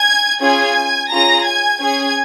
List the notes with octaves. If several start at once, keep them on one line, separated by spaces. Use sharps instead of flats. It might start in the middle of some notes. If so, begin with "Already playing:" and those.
Already playing: G#5 G#6
C#4 F4 G#4 G#5 G#6
C#4 F4 G#4 A#5 A#6
G#5 G#6
C#4 G#4 G#5 G#6